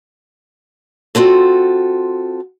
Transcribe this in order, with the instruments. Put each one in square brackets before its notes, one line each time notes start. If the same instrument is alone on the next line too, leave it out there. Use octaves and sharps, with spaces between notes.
[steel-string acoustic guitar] C4 F4 F#4 A4